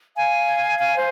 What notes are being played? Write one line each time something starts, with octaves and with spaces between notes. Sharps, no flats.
F5 G#5
F5 G#5
C5